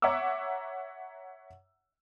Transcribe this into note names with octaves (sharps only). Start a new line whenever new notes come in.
C#5 E5 F#5 A#5 D6 E6